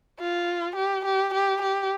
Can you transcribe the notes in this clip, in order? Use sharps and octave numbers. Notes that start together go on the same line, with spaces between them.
F4
G4
G4
G4
G4